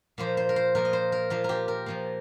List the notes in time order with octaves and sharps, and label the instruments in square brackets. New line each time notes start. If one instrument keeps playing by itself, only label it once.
[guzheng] A#2 F3 A#3 C5
C5
A#4
C5
A#2 F3 A#3 A#4
D#5
C5
A#4
A#2 F3 A#3 F4
G4 A#4
A#4
A#2 F3 A#3